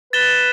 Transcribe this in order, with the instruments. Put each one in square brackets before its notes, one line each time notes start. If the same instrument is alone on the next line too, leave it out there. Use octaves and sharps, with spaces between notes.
[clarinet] B4 [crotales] A6 E7 G7